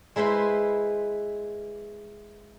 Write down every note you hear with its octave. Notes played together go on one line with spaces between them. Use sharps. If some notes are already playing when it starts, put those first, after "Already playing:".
G#3 E4 B4 C5 C6